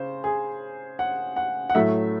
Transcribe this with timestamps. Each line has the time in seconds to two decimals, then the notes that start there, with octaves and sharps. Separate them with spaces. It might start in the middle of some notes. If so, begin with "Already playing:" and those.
Already playing: C#3 C5
0.24 G#4
0.99 F#5
1.36 F#5
1.70 F#5
1.75 A2 F#3 A3 E5